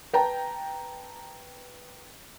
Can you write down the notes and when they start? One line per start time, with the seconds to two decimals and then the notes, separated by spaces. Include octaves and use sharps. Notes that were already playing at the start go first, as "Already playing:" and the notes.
0.13 B4 G5 A5 A#5